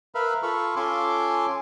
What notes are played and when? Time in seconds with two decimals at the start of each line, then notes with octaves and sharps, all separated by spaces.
0.15 A#4 B4 E5 F5 B5
0.43 F4 A4 F5 B5 C#6
0.76 C#4 F4 A4 G#5 C6 D6